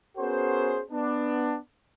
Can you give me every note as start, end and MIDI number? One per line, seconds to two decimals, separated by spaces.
0.18 0.80 59
0.18 0.80 61
0.18 0.80 66
0.18 0.80 68
0.18 0.80 70
0.18 0.80 72
0.91 1.56 59
0.91 1.56 62